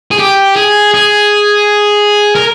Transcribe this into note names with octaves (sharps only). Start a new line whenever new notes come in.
G#4
G4
G#4
G#4
A#4